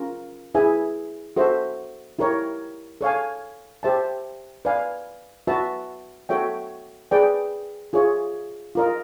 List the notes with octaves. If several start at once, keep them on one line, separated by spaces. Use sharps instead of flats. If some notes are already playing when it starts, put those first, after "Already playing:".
Already playing: C#4 F4 A#4
E4 G#4 B4 E5 G#5
F#4 A4 C5 E5
E4 G4 A#4 C#5
A4 C#5 F5 G#5
G4 C5 E5 A5
B4 D5 F5 G#5
F#4 B4 E5 A5
F#4 A4 C#5 E5 G5
G#4 B4 D5 G5
F4 G#4 C#5 E5
F4 A#4 D#5